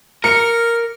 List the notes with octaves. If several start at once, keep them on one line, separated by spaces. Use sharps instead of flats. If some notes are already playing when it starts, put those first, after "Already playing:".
A#4 F6 C#7